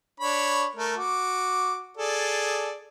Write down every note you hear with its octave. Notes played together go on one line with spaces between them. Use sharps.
D4 C#5 B5
A3 A#4
F#4 D6
G#4 A4 D5